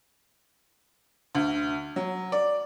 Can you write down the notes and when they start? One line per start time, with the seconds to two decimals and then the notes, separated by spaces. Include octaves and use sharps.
1.35 D2
1.96 F#3
2.32 D5